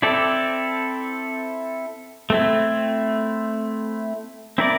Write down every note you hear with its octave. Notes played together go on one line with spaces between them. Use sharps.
C4 E4 A4 D5
A3 C4 E4
C4 E4 A#4 D5